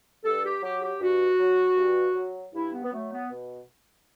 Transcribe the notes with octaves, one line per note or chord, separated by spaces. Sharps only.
G2 A4
G4
F#3 G4
G4
G2 F#4
F#3
G2
F#3
G2 E4
B3
B3
F#3 A3
B3
B2